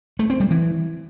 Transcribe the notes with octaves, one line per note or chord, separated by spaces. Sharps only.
A3
C4
G3
E3